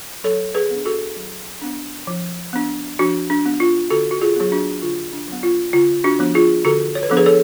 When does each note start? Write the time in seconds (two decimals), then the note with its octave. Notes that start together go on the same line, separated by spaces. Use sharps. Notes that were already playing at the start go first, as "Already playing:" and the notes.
0.24 F#3 A4 C#5
0.55 G#4 B4
0.71 B3 D4
0.86 F#4 A4
1.16 F#3
1.62 B3 D4
2.07 F3
2.53 B3 D4
2.99 F3 D4 F#4
3.30 D4
3.45 B3 D4
3.60 F4
3.90 D3 F#4 A4
4.11 F#4
4.21 F4 G#4
4.36 F#3 B3 G#4
4.52 D4 F#4
4.82 D3 F4
5.13 D4
5.28 F#3 B3
5.43 F4
5.73 D3 F4
6.04 D4 F#4
6.19 F3 B3 D4
6.35 F4 G#4
6.65 D3 F#4 A4
6.95 C#5
7.03 B4
7.10 F3 B3 D4 A4
7.17 G#4 B4
7.26 A4 C#5